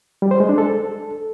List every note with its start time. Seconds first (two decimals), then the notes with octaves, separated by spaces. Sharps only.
0.22 G3
0.31 C5
0.40 G#3
0.49 D4
0.58 A4